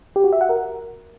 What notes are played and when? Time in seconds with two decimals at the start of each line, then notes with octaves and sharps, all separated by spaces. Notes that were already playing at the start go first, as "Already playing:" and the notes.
0.16 G4
0.24 F#4
0.33 E5
0.41 F#5
0.49 A#4